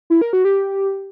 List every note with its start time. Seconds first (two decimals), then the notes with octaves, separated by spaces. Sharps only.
0.10 E4
0.21 A#4
0.33 F#4
0.45 G4